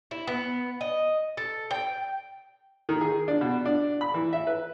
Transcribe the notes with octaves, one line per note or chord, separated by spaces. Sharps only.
E4
B3
D#5
A4
G5
D#3
G#4
D4
B2
D4
B5
E3
E5
B4